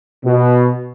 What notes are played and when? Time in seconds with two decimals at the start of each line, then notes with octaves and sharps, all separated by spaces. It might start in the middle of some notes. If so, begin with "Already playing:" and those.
0.25 B2